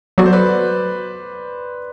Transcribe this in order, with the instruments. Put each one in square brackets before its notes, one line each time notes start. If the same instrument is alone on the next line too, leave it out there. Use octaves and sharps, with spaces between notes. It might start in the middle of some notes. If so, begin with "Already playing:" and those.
[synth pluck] F#3 B3 F#4 A4 [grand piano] D5
[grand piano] C5
B4 D5